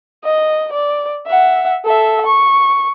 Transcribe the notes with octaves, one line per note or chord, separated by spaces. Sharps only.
D#5
D5
E5 F#5
A4 E5
C#6